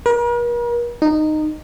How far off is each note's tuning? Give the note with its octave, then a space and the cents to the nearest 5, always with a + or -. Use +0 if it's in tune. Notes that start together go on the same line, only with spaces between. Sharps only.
A#4 +45
D#4 -15